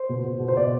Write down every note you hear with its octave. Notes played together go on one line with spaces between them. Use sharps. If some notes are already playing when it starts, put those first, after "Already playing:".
Already playing: C5
B2
B2
B2
C5
B2 D5